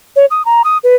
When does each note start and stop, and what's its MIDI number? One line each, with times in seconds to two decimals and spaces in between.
0.16 0.26 73
0.30 0.42 87
0.45 0.62 82
0.64 0.78 87
0.84 0.96 71